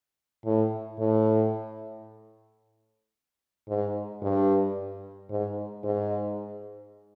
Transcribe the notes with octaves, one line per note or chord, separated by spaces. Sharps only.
A2
A2
G#2
G2
G#2
G#2